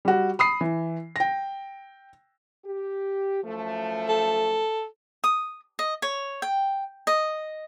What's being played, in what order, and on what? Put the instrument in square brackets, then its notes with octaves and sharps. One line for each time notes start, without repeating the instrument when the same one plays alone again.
[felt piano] G3 F#4
B5 D#6 C7
E3
G5 A#6
[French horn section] G4
F#2 F3 A3
[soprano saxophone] A4
[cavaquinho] D#6
D#5
C#5
G5
D#5